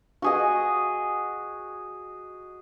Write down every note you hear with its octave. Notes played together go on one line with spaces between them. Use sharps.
F#4 G#4 D#5